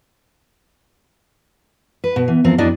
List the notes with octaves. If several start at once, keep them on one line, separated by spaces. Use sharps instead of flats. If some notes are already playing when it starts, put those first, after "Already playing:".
B4
B2
E3
E2 F3 C4 A#4
F2 F#3 D4 E4 D5 D#5